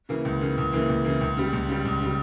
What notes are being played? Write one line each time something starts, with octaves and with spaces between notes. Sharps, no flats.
C#3 E3 A#3
C#2
C#3 E3 A#3
C#2
C#3 E3 A#3
C#2
C#3 E3 A#3
C#2
C#3 G3
C#2
C#3 G3
C#2
C#3 G3